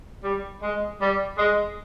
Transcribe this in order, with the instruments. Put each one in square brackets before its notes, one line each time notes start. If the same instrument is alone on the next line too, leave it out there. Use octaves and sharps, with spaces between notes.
[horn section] G3
G#3
G3
G#3